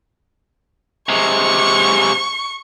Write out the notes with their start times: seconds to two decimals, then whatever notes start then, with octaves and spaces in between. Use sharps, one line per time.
1.09 C3 G#3 C#6